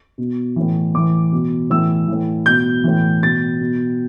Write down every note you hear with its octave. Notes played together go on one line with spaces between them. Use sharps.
B2
A2 E3
A2 E3 D6
B2
A2 E3 E6
A2 E3
B2 G6
A2 E3
B2 A6
B2